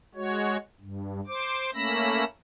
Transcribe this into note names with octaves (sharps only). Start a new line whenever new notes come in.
G#3 F#4 C#5
G2
C5 D6
A3 A#3 C#4 B5 E6 A#6